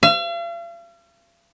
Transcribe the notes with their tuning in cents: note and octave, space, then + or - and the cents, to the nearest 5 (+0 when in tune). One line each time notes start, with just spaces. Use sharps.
F5 -45